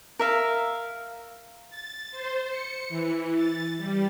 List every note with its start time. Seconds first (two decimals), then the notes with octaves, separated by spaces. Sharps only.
0.19 A#4 E5 F5
1.70 A6
2.11 C5
2.50 C#7
2.89 E3
3.35 A6
3.77 G3